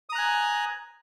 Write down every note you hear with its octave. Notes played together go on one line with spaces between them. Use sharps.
G#5 A#5 D#6 F#6